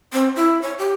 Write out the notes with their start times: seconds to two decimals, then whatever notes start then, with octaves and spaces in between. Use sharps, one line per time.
0.13 C4
0.36 E4
0.62 C#5
0.79 G4